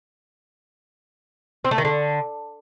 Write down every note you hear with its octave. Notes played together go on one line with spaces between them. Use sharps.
C4
A3
D#3
D3